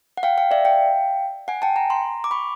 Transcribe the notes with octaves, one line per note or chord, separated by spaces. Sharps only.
F#5
F5 G5
F5 G5
D5 E5
F5 G5
F#5 G#5
G5 A5
G#5 A#5
A#5 C6
D6
B5 C#6